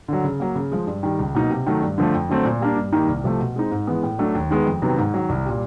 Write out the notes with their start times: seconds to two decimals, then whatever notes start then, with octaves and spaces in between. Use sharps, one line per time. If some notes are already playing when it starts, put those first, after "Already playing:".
0.08 D3 F#3
0.24 C#3
0.40 F#3 A#3
0.55 C#3
0.72 F3 G#3
0.87 G2
1.03 D#3 G3
1.19 C#2
1.35 B2 F#3 A#3 D#4
1.50 C3
1.66 D#3 F#3 A3
1.82 G2
1.98 D3 F3 A3
2.14 F2
2.29 D3 F#3 A3 C4
2.45 A#2
2.61 G3 A#3 D4
2.77 G2
2.92 D#3 G3 A#3 D#4
3.08 C2
3.24 C3 F3 A3
3.40 B2
3.56 G#3 C4 D#4
3.72 G#2
3.87 E3 G#3 B3
4.03 A2
4.19 F#3 A3 D4
4.35 D#2
4.50 D#3 G#3 B3
4.67 F2
4.82 C3 D#3 F#3 B3
4.98 G#2
5.14 D#3 F#3
5.29 C2
5.45 A#2 G3